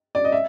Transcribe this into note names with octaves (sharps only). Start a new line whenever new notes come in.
D5
D#5
E5